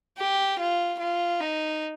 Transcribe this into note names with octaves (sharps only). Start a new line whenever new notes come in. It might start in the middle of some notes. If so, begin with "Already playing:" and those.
G4
F4
F4
D#4